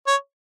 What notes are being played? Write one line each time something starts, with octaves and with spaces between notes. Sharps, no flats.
C#5